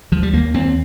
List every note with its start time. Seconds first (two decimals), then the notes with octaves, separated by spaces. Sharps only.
0.12 D#2 F3
0.23 G3
0.33 D#2 A#3
0.54 D#2 C4